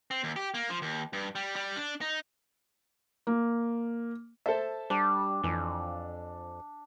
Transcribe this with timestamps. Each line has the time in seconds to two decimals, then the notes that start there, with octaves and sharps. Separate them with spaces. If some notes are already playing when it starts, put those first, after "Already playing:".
0.11 C4
0.24 D#2
0.36 G4
0.54 A#3
0.70 F3
0.82 D#2
1.13 G2
1.35 G3
1.56 G3
1.76 D4
2.01 D#4
3.27 A#3
4.46 A4 C5 E5 A5
4.90 G3 D4 D5
5.44 F2 E3